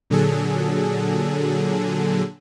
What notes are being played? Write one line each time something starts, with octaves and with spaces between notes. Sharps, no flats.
A#2 D3 F#3 G#4 A4